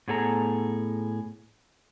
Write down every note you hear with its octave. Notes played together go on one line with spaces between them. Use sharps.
A2 B3 G#4 A4 A#5